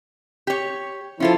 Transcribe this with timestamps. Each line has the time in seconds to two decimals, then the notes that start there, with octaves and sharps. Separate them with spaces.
0.47 G4 C#5
1.20 F3 C#4 E4 F4 A4